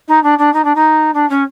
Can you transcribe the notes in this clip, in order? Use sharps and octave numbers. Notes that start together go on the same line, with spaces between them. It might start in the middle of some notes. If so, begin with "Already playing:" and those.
D#4
D4
D4
D#4
D4
D#4
D4
C#4